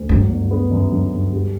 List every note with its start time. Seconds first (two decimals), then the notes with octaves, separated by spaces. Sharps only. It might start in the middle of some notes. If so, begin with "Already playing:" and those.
Already playing: D2
0.09 G2 F#3
0.30 G1
0.51 B3
0.71 F#2
0.92 F#3
1.12 G1
1.33 G3